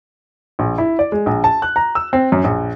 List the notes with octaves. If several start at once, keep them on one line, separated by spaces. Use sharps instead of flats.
A#1
E4
D5
G#3
A#1
A5
F#6
A#5
E6
C4
F#2
A#1